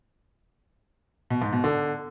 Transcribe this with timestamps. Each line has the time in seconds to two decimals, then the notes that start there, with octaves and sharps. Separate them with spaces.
1.30 B2
1.42 G#2
1.53 B2
1.64 D3